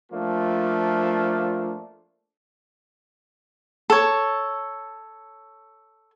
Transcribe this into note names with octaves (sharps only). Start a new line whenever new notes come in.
F3 A3 A#3 D4 F4
A4 C#5